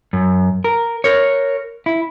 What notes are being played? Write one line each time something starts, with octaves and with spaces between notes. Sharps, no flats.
F#2
A#4
A#4 C#5
E4